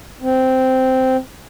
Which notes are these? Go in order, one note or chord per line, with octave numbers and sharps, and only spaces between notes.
C4